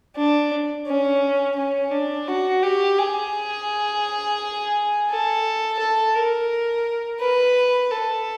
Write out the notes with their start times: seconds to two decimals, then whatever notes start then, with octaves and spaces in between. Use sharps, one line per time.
0.16 D4
0.87 C#4
1.56 C#4
1.92 D4
2.28 F#4
2.63 G4
2.98 G#4
5.10 A4
5.79 A4
6.15 A#4
7.21 B4
7.91 A4